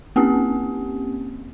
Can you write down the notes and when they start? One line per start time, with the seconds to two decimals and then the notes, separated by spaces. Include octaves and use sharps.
0.16 A#3 C4 C#4 G4